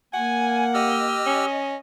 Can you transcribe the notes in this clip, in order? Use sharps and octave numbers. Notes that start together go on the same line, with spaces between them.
A#3 F#5 G#5
G4 D#5 E6 F6
C#4